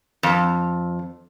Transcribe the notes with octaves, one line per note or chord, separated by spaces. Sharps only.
F2